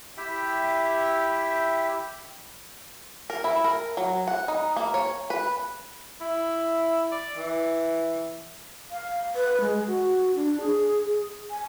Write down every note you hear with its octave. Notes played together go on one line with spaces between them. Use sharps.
E4 G4 E5 G5
A#4
E4
A#4
F#3
F#5
D#4
A#3
C#5
B4
E4
D5
E3
F5
B4
G#3
F#4
D4
G#4
G#5